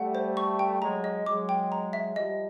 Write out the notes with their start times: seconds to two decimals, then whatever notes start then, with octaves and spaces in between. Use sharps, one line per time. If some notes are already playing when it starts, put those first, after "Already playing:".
Already playing: G3 A3 F#5
0.15 C5
0.37 C#6
0.59 G5
0.82 F#3 G#3 A#5
1.04 D#5
1.26 F#3 G#3 D6
1.49 G5
1.72 A#5
1.93 E5
2.16 F3 G3 D#5